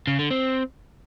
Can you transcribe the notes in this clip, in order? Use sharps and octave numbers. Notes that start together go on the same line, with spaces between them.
C#3
D3
C4